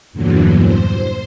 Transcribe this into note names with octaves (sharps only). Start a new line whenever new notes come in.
E2 G2 A#2 D3 E3 F#3
C5